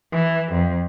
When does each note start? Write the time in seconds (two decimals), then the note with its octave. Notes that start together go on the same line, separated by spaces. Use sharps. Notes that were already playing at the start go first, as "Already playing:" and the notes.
0.13 E3
0.53 F2